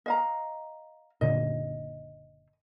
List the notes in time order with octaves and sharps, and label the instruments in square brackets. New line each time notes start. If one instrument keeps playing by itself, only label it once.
[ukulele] D#5 F5 A#5
[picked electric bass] F#1 A#2 D3 [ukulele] D#5